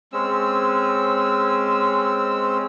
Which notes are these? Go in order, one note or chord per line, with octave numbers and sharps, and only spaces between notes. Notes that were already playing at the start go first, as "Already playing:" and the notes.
G#3 C4 C#4 E6